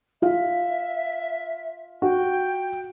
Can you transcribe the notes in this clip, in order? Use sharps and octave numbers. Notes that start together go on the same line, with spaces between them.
F4 E5 F5
F#4 G5